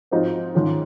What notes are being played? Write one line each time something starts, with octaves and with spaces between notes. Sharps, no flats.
G#2 F3 C4 D#4 F#4
G#2 D#3 G#3 C#4 F4